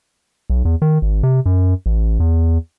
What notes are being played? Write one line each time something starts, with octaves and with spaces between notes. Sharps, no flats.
B1
E2
D#3
G#1
C3
F#2
A1
E2